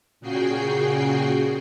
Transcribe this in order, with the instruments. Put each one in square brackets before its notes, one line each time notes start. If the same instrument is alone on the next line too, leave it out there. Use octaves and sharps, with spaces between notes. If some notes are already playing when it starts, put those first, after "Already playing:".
[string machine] A#2 C#3 F#4 G#4 G5 C7